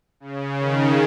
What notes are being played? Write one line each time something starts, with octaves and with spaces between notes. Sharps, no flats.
C#3
D#3